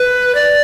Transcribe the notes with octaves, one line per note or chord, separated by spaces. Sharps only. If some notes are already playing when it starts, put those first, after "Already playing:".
Already playing: B4
D5